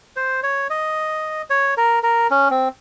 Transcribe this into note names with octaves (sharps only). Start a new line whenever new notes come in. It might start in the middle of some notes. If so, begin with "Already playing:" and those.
C5
C#5
D#5
C#5
A#4
A#4
C#4
C4